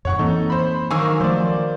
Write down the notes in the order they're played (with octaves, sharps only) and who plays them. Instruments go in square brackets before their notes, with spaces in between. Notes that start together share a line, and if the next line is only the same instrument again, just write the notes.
[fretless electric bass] F2 G#2 [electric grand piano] C#5 F#5 C#6
[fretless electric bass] E3 A#3 C4 [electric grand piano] D#4 A4
[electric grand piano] C5 B5
[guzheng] D#3 F#3 A#3 [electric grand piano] G#5 C#6 E6
[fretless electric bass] F3 A3 [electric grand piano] C5 D5